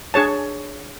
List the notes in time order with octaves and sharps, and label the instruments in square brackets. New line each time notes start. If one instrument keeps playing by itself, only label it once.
[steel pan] D4 G#4 C#5 A5